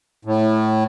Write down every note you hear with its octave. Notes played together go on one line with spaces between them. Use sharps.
A2